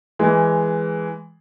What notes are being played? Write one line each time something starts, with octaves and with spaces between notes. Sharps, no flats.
E3 G#3